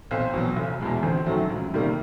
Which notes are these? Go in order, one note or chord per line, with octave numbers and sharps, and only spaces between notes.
B1 C4
B2 F#3
F1
E2 B2 G#3
G1 C4
F#2 D#3 F#3 A3
C#2
C3 D#3 G3 A#3